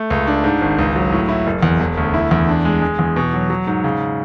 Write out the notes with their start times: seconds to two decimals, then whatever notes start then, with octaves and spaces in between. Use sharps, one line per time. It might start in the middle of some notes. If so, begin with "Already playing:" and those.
Already playing: A3
0.10 C#2
0.27 D4
0.44 G#2
0.61 G#1
0.79 C#2
0.96 F#3
1.12 A2
1.29 E4
1.47 F#1
1.63 E2
1.80 E1
1.97 D2
2.14 E4
2.31 E2
2.49 D4
2.65 G#3
2.82 G#3
2.99 E2
3.16 B2
3.33 F#3
3.50 F#3
3.67 G#2
3.84 C#3